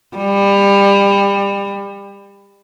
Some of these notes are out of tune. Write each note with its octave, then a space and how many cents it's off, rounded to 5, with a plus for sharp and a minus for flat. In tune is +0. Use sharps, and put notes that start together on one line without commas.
G3 +25